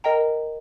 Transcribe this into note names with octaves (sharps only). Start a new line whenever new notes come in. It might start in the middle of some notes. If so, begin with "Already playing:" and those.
A#4 D#5 G5 A#5